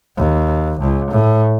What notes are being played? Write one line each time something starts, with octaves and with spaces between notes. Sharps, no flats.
D#2
C#2
A2